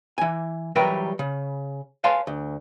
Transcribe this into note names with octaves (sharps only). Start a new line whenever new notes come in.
E3 G#5
E3 F#3 G3 A#4 B4 G5
C#3
B4 C#5 F5 G#5 A5 C6
D2